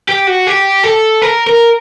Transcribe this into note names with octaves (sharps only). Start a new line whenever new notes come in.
G4
F#4
G4
A4
A#4
A#4